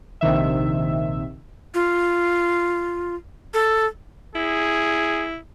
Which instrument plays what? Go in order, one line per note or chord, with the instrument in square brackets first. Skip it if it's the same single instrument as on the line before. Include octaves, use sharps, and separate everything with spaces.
[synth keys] A#1 C3 D#3 E5
[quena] F4
A4
[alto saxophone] E4 [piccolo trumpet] G#4